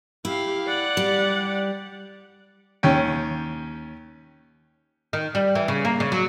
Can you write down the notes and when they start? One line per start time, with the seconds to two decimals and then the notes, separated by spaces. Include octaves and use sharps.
0.25 E4 G4 F5
0.67 D5 F#5
0.97 G3
2.83 D#2 C#4 G5
5.13 D#3
5.35 G3
5.55 E3
5.68 C#3
5.85 A#3
6.00 C#3
6.12 F#3